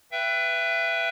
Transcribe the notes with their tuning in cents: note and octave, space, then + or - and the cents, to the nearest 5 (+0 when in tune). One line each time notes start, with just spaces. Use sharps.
B4 +0 E5 +25 G5 +0